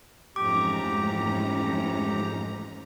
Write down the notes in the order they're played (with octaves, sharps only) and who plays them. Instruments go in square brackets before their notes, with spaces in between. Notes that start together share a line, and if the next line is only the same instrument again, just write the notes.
[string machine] F2 G#2 A#5 [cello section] E3 A3 C#4 [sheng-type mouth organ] G4 [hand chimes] D6